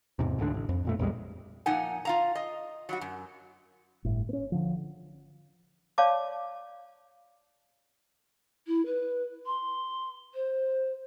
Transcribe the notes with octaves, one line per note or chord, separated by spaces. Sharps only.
E2 G#2 C3
D2 G#2 D3 D4
A1
F2
F2 A#2 A3
A#1 E2 G3 G#3
A#2 F3 D#4 F#5 G#5
F4 F5 A#5
D#5
F#3 G3 F#4
F#2
G1 A2
B3 C#4
D3 F3
C#5 D5 F5 A5 C6 D6
E4
B4
C6
C5